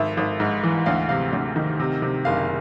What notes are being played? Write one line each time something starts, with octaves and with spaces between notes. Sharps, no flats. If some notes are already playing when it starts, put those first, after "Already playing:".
Already playing: G#1 E5
G#1
G#2
E3
D2 F5
C3 F5
D2
D#3
C3
C3
F#1 F5